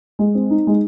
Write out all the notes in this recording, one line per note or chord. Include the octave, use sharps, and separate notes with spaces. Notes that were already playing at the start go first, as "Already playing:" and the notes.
G#3
C4
D#4
G#3